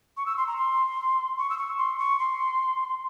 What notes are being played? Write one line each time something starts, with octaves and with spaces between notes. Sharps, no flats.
C#6
E6
C6
A#5
C6
C#6
E6
C#6
C6
C#6
C6